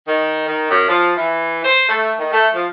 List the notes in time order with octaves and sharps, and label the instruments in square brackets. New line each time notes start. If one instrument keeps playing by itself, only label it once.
[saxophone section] D#3
D#3
F#2
F3
E3
C5
A3
D#3
A3
F3